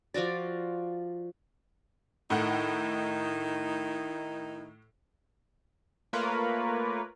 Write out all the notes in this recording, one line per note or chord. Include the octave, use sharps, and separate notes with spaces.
F3 F4 F#4 D5
A2 D#3 D#4 E4 F#5
A3 A#3 F4 A#4 B4 C#5